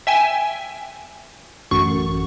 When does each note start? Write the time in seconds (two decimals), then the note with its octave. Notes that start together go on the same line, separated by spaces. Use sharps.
0.07 E5 G5 G#5
1.71 A1 F#2 C#6